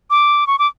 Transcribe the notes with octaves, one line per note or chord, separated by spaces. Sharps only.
D6
C#6
D6